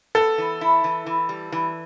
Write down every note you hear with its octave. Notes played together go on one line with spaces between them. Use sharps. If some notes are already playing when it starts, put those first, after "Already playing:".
B3 A4
E3
E4
E3
E3
G3
E3